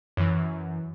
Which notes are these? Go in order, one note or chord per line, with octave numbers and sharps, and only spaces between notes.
F#2 E3